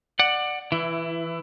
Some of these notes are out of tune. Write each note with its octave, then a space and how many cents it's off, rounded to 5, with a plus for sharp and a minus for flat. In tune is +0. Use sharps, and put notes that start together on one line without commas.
D5 +20 F#5 +0
E3 +0 E4 +25